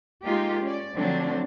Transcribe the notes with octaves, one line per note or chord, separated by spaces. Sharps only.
G#3 A#3 D#4 F4 G4
C#4 D5
D3 F3 F#3 A3 C4 D4